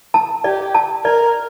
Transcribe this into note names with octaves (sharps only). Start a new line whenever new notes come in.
A5
G4 D5
A5
A#4 D5